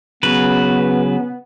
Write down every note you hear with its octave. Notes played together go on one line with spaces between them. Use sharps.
C#3 F#3 B3 B4